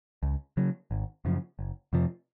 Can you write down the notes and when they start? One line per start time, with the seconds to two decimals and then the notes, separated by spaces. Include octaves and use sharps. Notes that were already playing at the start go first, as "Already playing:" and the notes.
0.23 C#2
0.57 C#3 F#3
0.91 G#1
1.25 F#2 C#3 F3
1.59 F#1
1.93 F2 C3 F3